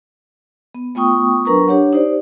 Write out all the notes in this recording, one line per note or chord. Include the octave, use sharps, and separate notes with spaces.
B3
A3 B3 F4 G5 C#6 D#6
F#3 D4 A#4 B4 A#5 C#6
D4 G4 C#5 F#5
D#4 G4 C5 D5